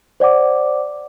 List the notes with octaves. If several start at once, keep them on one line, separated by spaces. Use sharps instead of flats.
C5 D5 F#5 D6